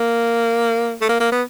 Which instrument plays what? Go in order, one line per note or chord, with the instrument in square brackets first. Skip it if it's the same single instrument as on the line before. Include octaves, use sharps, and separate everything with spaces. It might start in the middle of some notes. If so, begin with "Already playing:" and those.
Already playing: [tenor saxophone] A#3
A3
A#3
A#3
B3